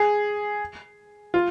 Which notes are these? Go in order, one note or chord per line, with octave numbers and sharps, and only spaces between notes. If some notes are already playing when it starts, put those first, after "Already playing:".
Already playing: G#4
F4